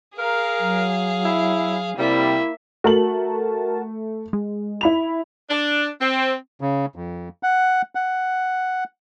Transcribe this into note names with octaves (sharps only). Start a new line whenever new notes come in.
G#4 A#4 F5
F#3
E4
C3 G3 A#3 E4 E5
A3 F#4 A#4 A5 F#7
G#3
E4 B5 F7
D4
C4
C#3
F2
F#5
F#5